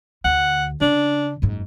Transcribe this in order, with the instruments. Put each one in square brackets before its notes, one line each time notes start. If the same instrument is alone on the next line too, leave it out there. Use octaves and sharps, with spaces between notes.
[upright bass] D2 [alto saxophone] F#5
[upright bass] C#3 [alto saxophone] D4
[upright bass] F#1 G#2